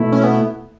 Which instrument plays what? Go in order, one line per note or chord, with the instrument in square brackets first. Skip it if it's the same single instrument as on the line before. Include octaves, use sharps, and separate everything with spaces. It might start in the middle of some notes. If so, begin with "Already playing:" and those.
Already playing: [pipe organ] B2 A3 E4
[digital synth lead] C#4
B3